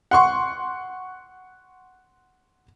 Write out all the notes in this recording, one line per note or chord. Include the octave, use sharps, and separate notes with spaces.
F#5 C6 C#6